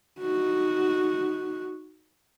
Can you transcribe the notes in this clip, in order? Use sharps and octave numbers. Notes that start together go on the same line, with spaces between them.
D#4 F#4